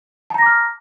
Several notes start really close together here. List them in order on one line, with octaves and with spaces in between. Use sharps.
A5 A#5 A#6 D6 F6